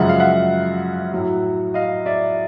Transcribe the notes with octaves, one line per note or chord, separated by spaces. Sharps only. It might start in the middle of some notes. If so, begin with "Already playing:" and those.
Already playing: F#2 C#3 F3 G#3 E5 F#5
F5
E5 F#5
A2 F#3
D#5 F5
D5 E5